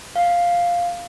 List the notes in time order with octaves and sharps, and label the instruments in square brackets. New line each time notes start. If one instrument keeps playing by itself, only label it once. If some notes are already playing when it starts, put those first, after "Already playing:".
[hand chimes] F5